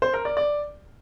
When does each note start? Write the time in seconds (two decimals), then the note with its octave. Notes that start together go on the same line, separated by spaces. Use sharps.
0.02 C5
0.14 A#4
0.25 D5
0.37 D5